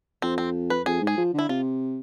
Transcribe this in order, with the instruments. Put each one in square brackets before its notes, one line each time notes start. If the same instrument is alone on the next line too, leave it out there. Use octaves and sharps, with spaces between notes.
[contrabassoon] F2 [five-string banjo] C4
[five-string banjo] C4
B4
[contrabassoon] F2 [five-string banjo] G#4
[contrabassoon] G#2
[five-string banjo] G#4
[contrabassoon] F3
[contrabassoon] D3 [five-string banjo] E4
[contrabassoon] C3 [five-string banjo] F4